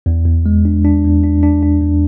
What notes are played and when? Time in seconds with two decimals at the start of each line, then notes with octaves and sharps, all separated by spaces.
0.06 E2
0.26 E2
0.46 G#3
0.65 D4
0.85 D4
1.04 E2
1.23 D4
1.43 D4
1.63 D4
1.82 E2